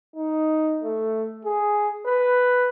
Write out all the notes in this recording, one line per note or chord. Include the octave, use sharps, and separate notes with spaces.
D#4
A3
G#4
B4